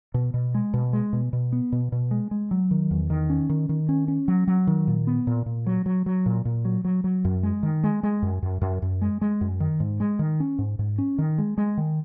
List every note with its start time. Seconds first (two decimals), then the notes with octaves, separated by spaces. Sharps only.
0.14 B2
0.34 B2
0.54 G#3
0.74 B2
0.93 G#3
1.13 B2
1.33 B2
1.53 B3
1.72 B2
1.92 B2
2.11 G#3
2.31 G#3
2.51 F#3
2.71 D#3
2.91 E2
3.10 D#3
3.30 C#4
3.49 D#3
3.69 D#3
3.89 C#4
4.08 C#4
4.28 F#3
4.48 F#3
4.67 D#3
4.87 A#2
5.07 B3
5.27 A#2
5.46 A#2
5.66 F#3
5.86 F#3
6.06 F#3
6.26 A#2
6.45 A#2
6.65 F#3
6.85 F#3
7.04 F#3
7.25 F#2
7.43 G#3
7.63 D#3
7.84 G#3
8.03 G#3
8.22 F#2
8.43 F#2
8.61 F#2
8.82 F#2
9.02 G#3
9.21 G#3
9.41 F#2
9.60 D#3
9.80 G#2
10.00 G#3
10.19 D#3
10.40 C#4
10.59 G#2
10.79 G#2
10.98 C#4
11.18 D#3
11.38 G#3
11.58 G#3
11.77 D#3